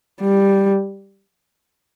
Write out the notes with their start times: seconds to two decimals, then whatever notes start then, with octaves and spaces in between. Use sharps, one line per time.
0.21 G3